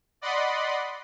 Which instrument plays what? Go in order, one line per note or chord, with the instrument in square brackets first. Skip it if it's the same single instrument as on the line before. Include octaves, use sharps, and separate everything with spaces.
[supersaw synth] D5 D#5 F#5 B5 C6